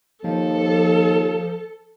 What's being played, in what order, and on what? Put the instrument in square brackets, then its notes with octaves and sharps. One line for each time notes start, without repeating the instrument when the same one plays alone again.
[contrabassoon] D#2 [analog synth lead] F3 [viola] A4